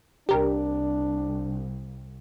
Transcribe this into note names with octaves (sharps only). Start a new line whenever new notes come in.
C2 D4 G4 A#4